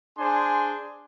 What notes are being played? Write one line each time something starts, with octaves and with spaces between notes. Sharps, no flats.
D4 G#4 C5 G#5 C6